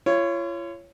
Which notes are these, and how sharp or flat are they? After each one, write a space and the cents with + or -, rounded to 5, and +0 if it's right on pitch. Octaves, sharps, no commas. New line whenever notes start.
F4 -40 C#5 +0